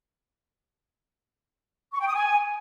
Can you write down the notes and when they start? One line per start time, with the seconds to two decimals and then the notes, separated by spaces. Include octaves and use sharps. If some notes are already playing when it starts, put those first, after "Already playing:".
1.93 C#6
2.00 G5
2.07 D#6
2.14 G#5